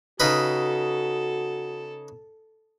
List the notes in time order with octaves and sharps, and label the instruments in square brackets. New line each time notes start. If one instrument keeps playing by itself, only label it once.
[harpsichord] C#3 D#4 B4 [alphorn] F#4 [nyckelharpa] A4